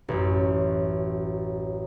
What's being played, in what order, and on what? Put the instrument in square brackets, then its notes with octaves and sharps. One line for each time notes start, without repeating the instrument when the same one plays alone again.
[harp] A1 F#2